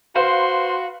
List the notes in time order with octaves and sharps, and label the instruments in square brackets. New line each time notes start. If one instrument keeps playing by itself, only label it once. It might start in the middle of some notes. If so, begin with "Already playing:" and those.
[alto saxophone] F#4 [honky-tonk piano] B4 F5 [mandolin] C5 [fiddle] C6